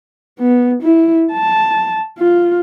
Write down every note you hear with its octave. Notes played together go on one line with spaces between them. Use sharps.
B3
E4
A5
F4